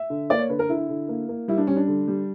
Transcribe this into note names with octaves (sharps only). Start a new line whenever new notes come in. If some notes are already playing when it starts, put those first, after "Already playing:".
Already playing: E5
D3
A#3 D5
C#5
D3 B4
A#4
D3 E4
D3
A#3
A#3
G3 E4
D4
G3 C#4
D4
D3
G3